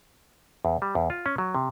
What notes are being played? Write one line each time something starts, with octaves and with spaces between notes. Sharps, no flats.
E2
G3
E2
F4
C#4
F#3
C3